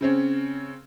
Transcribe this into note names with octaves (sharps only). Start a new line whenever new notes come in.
C#3 C4 C#4